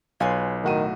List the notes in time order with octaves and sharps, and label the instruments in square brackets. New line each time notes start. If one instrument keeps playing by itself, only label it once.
[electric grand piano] B1 [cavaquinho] F4 G#5 C6 [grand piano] B4 C#5
[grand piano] A2 F#4 D#7 [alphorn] D#3